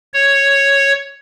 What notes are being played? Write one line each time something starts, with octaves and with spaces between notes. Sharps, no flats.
C#5